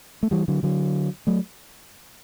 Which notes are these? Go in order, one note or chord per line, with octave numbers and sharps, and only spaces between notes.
A3
E3 G3
D3 F#3
D3 F#3
F#3 A3